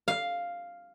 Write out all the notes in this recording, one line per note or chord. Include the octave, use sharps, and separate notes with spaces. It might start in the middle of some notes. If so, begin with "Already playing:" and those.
F5